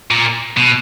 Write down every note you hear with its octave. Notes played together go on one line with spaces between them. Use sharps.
A#2
B2